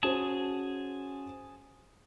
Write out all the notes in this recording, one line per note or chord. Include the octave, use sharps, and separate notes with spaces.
C#4 F#4 G#4 C5 A5